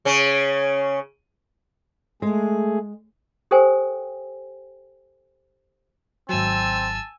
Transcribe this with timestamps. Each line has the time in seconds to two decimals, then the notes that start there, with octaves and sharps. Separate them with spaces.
0.05 C#3 C#4
2.22 G#3 A3 G#4
3.51 G4 A4 A#4 C5 G5 G#5
6.29 G#1 F#3 C4 G#5 A5 E6